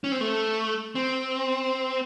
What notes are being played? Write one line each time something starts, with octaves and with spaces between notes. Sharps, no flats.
C#4
C4
A3
C4